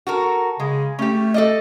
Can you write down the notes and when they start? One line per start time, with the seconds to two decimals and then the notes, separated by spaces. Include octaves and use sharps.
0.07 F#4 A4 A#4
0.60 C#3 G#3
0.99 A3 C#4 G4
1.34 A4 D5 D#5